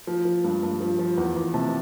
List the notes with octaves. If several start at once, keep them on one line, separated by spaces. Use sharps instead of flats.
F3
F3
G2
G2
F3
F3
E2
E2
C3 A5